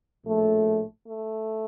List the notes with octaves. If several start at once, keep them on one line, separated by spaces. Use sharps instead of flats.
A#1 A2 F3 A3
A3